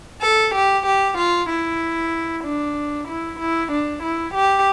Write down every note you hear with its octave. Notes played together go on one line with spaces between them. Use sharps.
A4
G4
G4
F4
E4
D4
E4
E4
D4
E4
G4